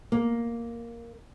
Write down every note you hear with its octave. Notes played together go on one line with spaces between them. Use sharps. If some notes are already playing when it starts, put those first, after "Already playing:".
A#3